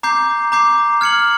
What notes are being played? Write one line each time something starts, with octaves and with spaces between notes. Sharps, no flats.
A#5 D6 G6 C7
A#5 D6 G6 C7
F6 G#6 C#7 F#7